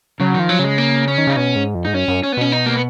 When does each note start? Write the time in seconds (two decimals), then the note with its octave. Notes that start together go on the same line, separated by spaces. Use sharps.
0.20 C#3 F#3
0.34 D#3
0.40 F3
0.49 F#3
0.59 C#3 G#3
0.78 A#3
1.08 C#4
1.18 D#3
1.27 C#3 D#4
1.36 B2 C#4
1.56 G#2
1.75 F2
1.85 G#2 D#4
1.93 F#2 C#4
2.08 F#2
2.23 C#4
2.32 B3
2.37 B2 C#4
2.52 D#4
2.66 A#3
2.74 B3